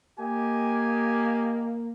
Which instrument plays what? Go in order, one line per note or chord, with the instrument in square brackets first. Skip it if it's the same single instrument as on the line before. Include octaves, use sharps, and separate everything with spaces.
[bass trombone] A#3 [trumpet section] G4 D#5 G#5